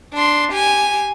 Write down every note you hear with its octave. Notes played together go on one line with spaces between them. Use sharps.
D4 C6
G4 G#5